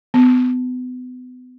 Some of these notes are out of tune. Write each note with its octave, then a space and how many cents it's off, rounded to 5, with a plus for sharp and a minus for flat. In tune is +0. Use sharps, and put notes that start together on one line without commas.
B3 +35